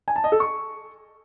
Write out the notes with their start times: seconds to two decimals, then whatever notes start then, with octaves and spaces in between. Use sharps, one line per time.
0.08 G#5
0.16 A5
0.24 D#5
0.32 A4
0.40 C#6